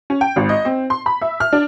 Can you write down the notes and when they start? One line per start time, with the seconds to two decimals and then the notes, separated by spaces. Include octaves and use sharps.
0.10 C#4
0.21 G5
0.36 G#1
0.49 D#5
0.65 C4
0.90 C6
1.06 B5
1.22 E5
1.40 F6
1.53 D4